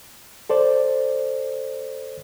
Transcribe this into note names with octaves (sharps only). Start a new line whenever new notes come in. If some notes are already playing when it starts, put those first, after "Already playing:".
A4 C5 D5